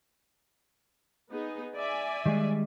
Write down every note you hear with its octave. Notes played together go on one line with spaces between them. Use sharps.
B3 D#4 G#4
D5 E5 G#5
D#3 G3 G#3